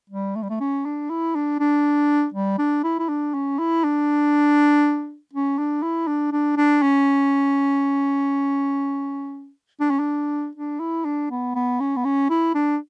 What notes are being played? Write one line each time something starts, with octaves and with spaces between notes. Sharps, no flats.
G3
A3
G3
A3
C#4
D4
E4
D4
D4
G3
D4
E4
E4
D4
C#4
E4
D4
C#4
D4
E4
D4
D4
D4
C#4
D4
C#4
D4
D4
E4
D4
B3
B3
C#4
B3
C#4
E4
D4